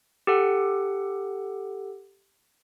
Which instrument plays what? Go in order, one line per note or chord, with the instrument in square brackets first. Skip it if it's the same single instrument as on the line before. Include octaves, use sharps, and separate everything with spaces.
[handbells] G4 A4 F#5